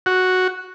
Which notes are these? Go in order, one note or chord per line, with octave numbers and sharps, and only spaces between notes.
F#4